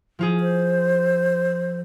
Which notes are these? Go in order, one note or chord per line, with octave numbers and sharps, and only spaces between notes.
F3 F4 G#4
C5